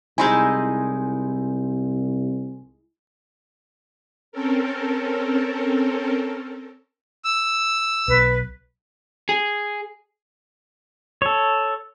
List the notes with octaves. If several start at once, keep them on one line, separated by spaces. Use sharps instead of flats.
C2 G#3 D#4 E4 G#5 C6 G6
C4 C#4 A4 A#4
E6
B1 B4
G#4
A4 C#5